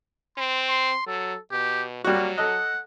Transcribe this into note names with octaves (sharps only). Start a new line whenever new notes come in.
C4 C6
C6
F#3 A4
B2 G4
F#3 G3 A#3 F#4
A4 D#5 F#5